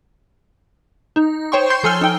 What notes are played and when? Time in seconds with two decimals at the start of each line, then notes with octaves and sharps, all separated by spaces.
1.16 D#4
1.52 C5 C#5 G5 C6 C#6
1.70 C6 G6 C7
1.83 F3 A4 G#5 E6 F6 G7
2.01 D#4 G5 G7